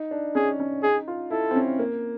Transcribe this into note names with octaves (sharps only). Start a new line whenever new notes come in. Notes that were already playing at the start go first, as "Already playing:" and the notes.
Already playing: D#4
D4
C#4 G#4
C#4
D#4 G#4
F4
E4 A4
C4
C#4
A#3